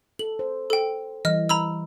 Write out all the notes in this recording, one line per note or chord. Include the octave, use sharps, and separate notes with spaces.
A4 F#7
C5
A4 G5
E3 G3 D#5 F6
A#5 B5 E6